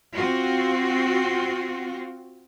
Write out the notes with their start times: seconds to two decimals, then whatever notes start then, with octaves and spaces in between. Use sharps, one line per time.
0.14 C4 F4 F#4